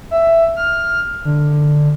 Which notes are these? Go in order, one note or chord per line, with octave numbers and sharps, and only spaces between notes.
E5
F6
D3